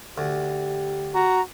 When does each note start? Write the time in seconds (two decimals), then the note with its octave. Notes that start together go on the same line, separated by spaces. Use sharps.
0.18 D2 G4
1.14 F#4 A#5